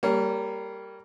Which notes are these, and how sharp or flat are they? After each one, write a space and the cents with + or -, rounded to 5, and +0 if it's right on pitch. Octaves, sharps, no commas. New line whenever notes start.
G3 +0 A#3 -15 C#5 +30